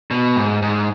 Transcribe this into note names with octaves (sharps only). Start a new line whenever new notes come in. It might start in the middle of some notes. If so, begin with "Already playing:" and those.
B2
G#2
G#2